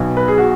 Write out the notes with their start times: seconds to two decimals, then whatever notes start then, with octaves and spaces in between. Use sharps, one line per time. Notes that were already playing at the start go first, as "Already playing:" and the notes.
Already playing: B1 B2
0.17 B4
0.28 G#4
0.38 F#4